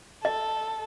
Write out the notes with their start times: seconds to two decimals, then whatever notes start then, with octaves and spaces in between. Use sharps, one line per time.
0.25 A4 D#5